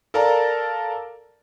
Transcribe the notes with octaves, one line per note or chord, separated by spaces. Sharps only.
A4 A#4 D5 F5 A5 A#5